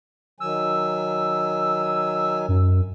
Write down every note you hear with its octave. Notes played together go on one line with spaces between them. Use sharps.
D#3 F#3 G#5 E6
F#2